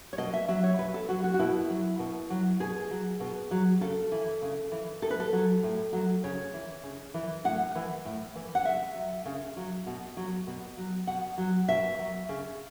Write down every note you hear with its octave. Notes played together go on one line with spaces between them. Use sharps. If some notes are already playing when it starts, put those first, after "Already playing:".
C#5
B2 D#5
E5
F#3 E5
C#5
B2 B4
A4
F#3 F#4
F#4
F#4
B2 E4
F#3
B2
F#3
B2 G#4
F#3
B2
F#3
C#3 A4
E3
C#3
E3
A2 A4
B4
A4
F#3
A2
F#3
C#3 C#5
E3
C#3
E3
A2 F#5
E3
A2
E3
F#5
C#3 E5
F#3
C#3
F#3
B2
F#3
B2
F#3
B2 F#5
F#3
B2 E5
F#3
C#3